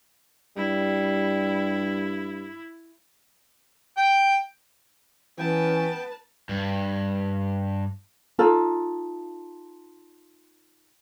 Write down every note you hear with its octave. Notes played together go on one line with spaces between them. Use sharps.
G2 G3 E4
G5
E3 B3 C#4 B4 G5 A5
G2
D#4 F4 A4